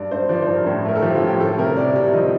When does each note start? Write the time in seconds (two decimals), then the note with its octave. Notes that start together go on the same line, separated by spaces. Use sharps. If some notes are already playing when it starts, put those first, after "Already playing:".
Already playing: G2 D5
0.11 G2 C5
0.29 F3 D5
0.42 C5
0.47 G2
0.54 A#4
0.66 A2
0.85 A3 A#4
0.96 A4
1.03 F3 G4
1.15 F4
1.22 A2
1.28 G4
1.40 G3 A4
1.58 C3 A#4
1.76 C3 D5
1.96 G3
2.13 F3 D#5